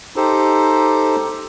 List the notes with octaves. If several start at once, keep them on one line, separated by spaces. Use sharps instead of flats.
D#4 G4 A4 C5